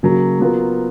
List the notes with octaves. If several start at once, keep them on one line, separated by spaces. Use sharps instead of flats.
C#3 F#3 A#3
F#3 B3 F4 A#4